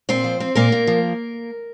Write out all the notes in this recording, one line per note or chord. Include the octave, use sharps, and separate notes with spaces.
A#2 C4 C5
F3
C4
A#2 A#3 A#4
A#2
F3